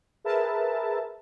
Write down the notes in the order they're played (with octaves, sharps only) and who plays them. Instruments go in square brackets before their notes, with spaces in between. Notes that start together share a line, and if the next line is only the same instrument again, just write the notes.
[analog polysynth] G#4 A#4 B4 E5 A5